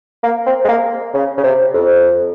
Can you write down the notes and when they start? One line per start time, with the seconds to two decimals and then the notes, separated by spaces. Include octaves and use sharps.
0.23 A#3
0.46 C4
0.64 G#3
0.68 A#3
1.14 C#3
1.37 C#3
1.43 C3
1.74 F2